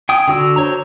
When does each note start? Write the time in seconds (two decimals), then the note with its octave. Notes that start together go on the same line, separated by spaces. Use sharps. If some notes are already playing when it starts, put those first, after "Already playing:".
0.09 G5 G#5 D#6
0.28 D3 F#4 E6
0.56 C5 C#5 A#5